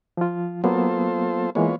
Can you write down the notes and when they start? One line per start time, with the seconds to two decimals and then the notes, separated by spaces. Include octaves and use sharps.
0.17 F3 F4
0.64 F#3 A#3 B3 F4 A4 C5
1.55 E3 G#3 A#3 B3 F4 C#5